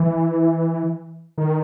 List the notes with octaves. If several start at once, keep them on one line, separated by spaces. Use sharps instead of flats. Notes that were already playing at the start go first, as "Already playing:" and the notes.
Already playing: E3
D#3